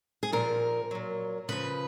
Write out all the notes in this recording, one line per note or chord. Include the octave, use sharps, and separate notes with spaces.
G#4
A#2 F3 A#4
A#2 F#3
C#3 F3 B4